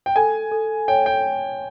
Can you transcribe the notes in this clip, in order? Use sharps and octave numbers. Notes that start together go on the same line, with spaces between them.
G5
A4 G#5
A4
C#5 G5
G5